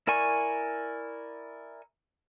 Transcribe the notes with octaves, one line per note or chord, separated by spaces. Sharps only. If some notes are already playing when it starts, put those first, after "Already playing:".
E4 A#4 D5 G#5 C#6